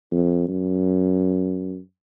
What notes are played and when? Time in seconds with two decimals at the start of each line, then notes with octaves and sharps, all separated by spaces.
0.12 F2
0.48 F#2